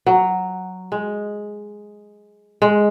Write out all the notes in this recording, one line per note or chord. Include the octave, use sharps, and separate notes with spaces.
F#3
G#3
G#3